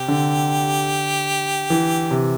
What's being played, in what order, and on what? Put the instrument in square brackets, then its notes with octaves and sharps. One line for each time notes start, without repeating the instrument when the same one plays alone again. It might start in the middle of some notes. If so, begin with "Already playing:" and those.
Already playing: [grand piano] C3 [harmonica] G4
[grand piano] D3
E3
C3